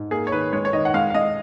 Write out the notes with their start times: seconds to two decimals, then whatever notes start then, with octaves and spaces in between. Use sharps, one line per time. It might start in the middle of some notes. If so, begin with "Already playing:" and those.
Already playing: G#2
0.11 A#3 G#4
0.27 C#5
0.32 D#3 B4
0.52 G#3 C#5
0.65 C#5
0.73 D#3 D#5
0.85 F#5
0.94 G#3 F5
1.10 F5
1.14 G#3 D#5